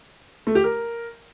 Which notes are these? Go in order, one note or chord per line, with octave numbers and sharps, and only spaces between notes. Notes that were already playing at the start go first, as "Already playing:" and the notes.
A3
G4
A#4